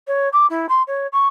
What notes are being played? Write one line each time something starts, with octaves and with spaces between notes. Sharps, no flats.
C#5
D6
E4
C6
C#5
C#6